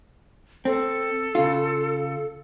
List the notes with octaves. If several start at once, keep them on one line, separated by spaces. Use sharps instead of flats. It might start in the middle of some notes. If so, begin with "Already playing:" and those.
C4 A4
C#3 F4